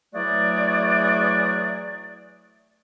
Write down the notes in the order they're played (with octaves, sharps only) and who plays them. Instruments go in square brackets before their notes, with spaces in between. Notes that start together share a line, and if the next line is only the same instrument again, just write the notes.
[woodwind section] E3 F#3 A3 F#4 G#4 D5